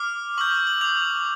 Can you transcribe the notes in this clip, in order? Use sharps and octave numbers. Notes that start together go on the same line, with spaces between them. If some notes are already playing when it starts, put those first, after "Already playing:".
Already playing: D6 F6
C#6 E6 G6 F#7
F#7
D6 G6 F7